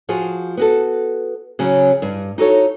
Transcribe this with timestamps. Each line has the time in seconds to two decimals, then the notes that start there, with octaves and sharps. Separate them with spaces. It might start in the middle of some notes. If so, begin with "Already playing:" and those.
0.09 F3 F4 F#4 G#4
0.57 B3 F#4 A4
1.59 C#3 F#3 C#4
2.02 G2
2.38 D#4 F#4 A4 C#5